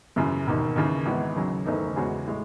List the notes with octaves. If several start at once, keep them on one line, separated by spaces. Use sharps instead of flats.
F#2 C#3 E3
E1 D#2 D#3
D#2 C#3 E3
G#1 G#2 E3 B3
D#2 C#3 F#3
F#1 E2 D#3 A3 D#4
E2 C#3 G#3 C#4 F#4
A2 G#3